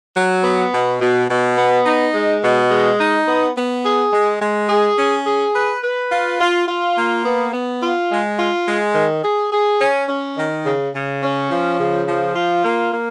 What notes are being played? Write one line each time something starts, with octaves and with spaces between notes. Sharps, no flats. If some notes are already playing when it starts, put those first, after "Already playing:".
F#3
B3
B2
B2
B2
B3
D#4
G#3
B2
G#3
D#4
B3
B3
G#4
G#3
G#3
G#4
C#4
G#4
B4
B4
F4
F4
F4
A#3
B3
B3
F4
G#3
F4
G#3
D#3
G#4
G#4
C#4
C#4
D#3
C#3
C#3
C#4
F3
C#3
F3
F4
A#3
A#3